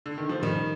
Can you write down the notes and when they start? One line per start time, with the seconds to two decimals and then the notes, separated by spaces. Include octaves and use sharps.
0.06 D3
0.18 D#3
0.29 F3
0.41 D#3 G3